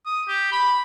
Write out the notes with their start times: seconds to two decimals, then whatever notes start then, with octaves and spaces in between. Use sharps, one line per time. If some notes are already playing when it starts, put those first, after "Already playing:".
0.06 D#6
0.28 G4
0.52 B5